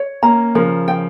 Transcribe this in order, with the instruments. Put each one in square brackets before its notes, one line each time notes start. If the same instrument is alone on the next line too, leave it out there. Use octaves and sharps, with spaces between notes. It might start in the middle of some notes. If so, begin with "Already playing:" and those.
Already playing: [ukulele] C#5
[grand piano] A#3 C#4 [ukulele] A#5
[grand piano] C#3 F3 [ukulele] A#4
[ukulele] G5